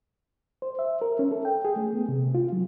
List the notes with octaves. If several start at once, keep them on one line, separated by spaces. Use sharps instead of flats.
C5
E5
A#4
C#4
A4
G5
G#4
A3
B3
C3
F4
F#3